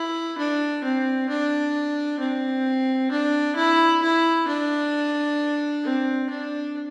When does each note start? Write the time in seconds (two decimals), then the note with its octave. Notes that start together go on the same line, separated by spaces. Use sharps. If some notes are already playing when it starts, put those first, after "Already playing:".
Already playing: E4
0.38 D4
0.84 C4
1.29 D4
2.20 C4
3.11 D4
3.56 E4
4.02 E4
4.48 D4
5.84 C4
6.29 D4